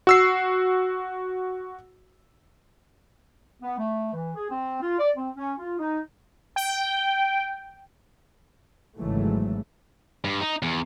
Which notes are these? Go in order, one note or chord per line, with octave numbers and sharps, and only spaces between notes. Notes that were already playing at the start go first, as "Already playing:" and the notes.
F#4 E6 C7
B3
A3
E3
G#4
C4
F4
D5
C4
C#4
F4
D#4
G5
G#1 C#3 E3 F#3 G#3 A3
G2
D#4
E2